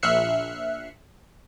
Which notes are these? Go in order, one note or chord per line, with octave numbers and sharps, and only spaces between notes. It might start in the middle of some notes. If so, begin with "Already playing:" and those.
A#1 E5 F6 F#6 C7 C#7